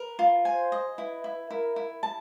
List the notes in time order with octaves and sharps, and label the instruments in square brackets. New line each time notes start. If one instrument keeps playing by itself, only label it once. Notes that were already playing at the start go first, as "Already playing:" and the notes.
Already playing: [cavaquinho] A#4 [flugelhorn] B4
[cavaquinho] F4
[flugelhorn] C5 [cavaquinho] G#5
[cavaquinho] D#5
[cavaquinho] E4 [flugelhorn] B4
[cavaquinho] E4
[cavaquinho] E4 [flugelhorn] A#4
[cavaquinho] E4
A5